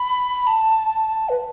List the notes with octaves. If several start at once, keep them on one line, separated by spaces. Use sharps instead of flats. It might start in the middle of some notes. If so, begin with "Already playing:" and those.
Already playing: B5
A5
B4